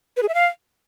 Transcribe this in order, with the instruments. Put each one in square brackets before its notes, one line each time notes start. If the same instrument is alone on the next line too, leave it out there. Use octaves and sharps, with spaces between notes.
[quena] B4
G#4
E5
F5